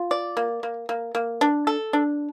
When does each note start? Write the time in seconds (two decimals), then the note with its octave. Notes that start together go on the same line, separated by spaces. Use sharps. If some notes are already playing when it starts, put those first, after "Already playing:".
Already playing: F4
0.11 D5
0.37 A#3
0.63 A#3
0.89 A#3
1.15 A#3
1.41 D4
1.67 A4
1.93 D4